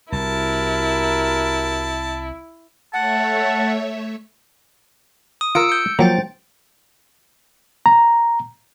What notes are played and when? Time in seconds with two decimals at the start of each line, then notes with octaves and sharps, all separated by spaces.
0.12 C2 E4 F#4 G4 A#4 A5
2.93 A3 C#5 E5 F#5 A5
5.41 D#6
5.55 F4 A#4 E6 C#7 D7
5.69 G6 C#7
5.99 F3 F#3 A#3 C5 G5 A6
7.86 A#5